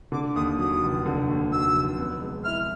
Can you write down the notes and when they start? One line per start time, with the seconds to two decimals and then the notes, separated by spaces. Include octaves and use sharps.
0.12 D3 D6
0.36 D#2 D#6
0.58 F#3 D#6
0.82 F1
1.06 D3
1.29 D#2
1.52 F#3 E6
1.75 F1
1.98 B3
2.21 G#3
2.44 E4 F6